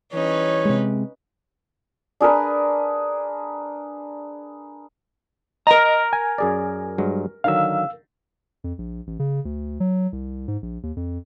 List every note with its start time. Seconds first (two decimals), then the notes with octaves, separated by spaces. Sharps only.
0.13 E3 G3 C#4 D#4 B4 C#5
0.65 C3 G#3
2.20 D4 G#4 A#4 B4
5.67 A#4 D#5 A#5
6.13 G#5
6.38 F#2 G#4 D5
6.98 G2 F#3 G#3
7.44 D3 D#3 F#3 F5 E6
8.64 F2
8.78 A#1
9.07 A1
9.19 C#3
9.45 D2
9.80 F#3
10.12 C2
10.48 G#2
10.62 A#1
10.83 D#2
10.97 F2